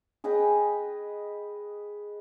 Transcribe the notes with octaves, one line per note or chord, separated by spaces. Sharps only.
G#4 B4 D#5 G5